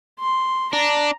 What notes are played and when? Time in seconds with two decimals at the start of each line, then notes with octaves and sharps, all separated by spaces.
0.20 C6
0.73 D4 A#5